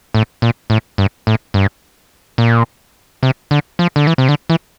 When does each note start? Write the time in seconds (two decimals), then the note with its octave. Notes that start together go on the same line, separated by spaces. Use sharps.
0.14 A2
0.42 A#2
0.70 A2
0.98 G2
1.27 A2
1.54 G2
2.38 A#2
3.23 C3
3.51 D3
3.79 F3
3.96 D3
4.07 E3
4.18 C3
4.29 D3
4.50 E3